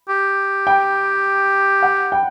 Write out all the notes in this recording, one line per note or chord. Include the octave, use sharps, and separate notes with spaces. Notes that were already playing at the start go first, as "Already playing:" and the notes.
G4
G5
F#5
G5